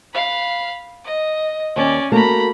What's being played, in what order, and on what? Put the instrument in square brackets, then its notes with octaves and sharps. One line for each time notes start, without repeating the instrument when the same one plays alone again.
[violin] F5 B5
D#5
[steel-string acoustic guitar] D#2 [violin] C#4 D5
[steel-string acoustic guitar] A3 A#3 F#4 [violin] A#5 B5